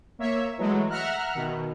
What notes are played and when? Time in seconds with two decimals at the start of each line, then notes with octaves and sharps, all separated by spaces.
0.19 A#3 C#5 E5
0.58 E3 F#3 G#3 A3
0.89 E5 F#5 A#5 F6 F#6
1.35 B2 D#3